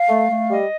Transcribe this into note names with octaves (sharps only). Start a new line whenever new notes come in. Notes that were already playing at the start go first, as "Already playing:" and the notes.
Already playing: F5
A3
A3
G3 D#5